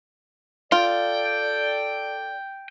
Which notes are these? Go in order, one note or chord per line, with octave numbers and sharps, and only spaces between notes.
F4 A4 D5 G5